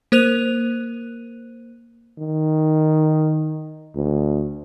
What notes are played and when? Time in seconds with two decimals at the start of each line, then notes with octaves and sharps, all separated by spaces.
0.12 A#3 A#4 C5 F#6 D#7 F7
2.18 D#3
3.95 D2